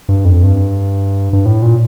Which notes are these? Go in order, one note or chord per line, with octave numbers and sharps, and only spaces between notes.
G2
F2
G2
G2
A2
A#2